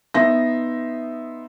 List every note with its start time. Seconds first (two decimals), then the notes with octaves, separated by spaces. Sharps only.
0.14 B3 D#4 E5 C6 A#6